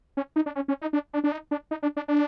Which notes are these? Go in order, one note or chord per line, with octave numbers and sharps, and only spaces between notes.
C#4
D#4
D4
C#4
C#4
D#4
D4
D4
D4
D#4
D4
D#4
D4
D4
D4